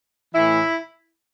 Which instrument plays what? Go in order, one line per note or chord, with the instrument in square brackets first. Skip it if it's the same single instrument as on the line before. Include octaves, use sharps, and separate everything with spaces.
[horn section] A2 E3 E4